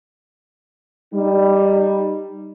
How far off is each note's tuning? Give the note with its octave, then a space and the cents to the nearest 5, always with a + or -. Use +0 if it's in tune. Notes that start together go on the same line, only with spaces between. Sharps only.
G3 +0 D#4 -15